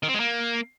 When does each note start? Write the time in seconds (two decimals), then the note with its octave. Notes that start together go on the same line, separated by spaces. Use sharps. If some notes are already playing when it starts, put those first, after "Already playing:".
0.03 D#3
0.09 C4
0.14 G#3
0.20 A#3